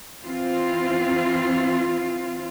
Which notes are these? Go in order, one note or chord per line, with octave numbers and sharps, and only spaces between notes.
E3 C4 F4